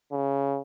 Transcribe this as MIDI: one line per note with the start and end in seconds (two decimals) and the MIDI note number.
0.12 0.61 49